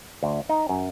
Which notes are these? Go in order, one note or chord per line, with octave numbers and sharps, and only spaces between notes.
D2
D#4
F#2